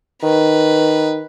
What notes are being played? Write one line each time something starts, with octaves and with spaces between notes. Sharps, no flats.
D#3 B4